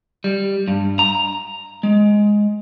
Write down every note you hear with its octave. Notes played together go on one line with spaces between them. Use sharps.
G3
G2
A#5
G#3